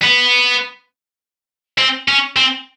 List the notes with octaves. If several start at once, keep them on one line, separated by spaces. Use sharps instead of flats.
B3
C4
C#4
C4